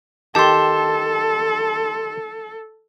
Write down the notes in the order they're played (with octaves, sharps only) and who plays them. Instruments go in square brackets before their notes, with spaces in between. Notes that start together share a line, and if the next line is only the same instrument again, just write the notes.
[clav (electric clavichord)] D#3 G4 [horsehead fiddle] A4 [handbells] A5 C6